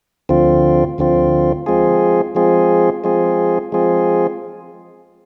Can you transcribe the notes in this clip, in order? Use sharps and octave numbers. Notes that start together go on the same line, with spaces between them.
D2 D3 F3 C4 F4
D2 D3 F3 C4 F4
F3 G#3 C4 F4 G#4
F3 G#3 C4 F4 G#4
F3 G#3 C4 F4 G#4
F3 G#3 C4 F4 G#4